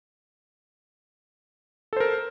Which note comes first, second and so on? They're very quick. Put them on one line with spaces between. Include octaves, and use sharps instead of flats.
A4 C5 A#4